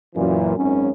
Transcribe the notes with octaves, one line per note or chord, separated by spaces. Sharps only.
F#2 A#2 E3
G#1 F#2 C#4